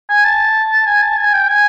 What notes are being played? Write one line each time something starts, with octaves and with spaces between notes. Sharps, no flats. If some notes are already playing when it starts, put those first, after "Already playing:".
G#5
A5
G#5
A5
G#5
G5
G#5